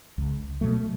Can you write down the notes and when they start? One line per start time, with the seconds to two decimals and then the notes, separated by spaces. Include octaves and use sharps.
0.18 C#2
0.61 B2 F#3 A3